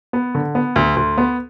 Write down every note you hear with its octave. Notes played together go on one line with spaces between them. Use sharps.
B3
D3
B3
D2
D2
B3